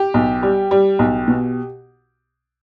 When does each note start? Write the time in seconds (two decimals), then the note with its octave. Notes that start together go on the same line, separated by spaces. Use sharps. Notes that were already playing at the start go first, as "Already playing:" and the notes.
Already playing: G4
0.14 B1
0.43 G3
0.71 G3
0.99 B1
1.28 B2